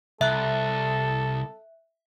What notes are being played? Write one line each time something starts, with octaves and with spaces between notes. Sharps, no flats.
C2 A4 E5 F#6